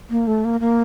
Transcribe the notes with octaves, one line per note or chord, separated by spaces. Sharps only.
A#3
A3
A#3
A#3